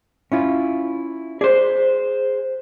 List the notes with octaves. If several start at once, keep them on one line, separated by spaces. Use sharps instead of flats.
C#4 E4 F4
G#4 C5 D5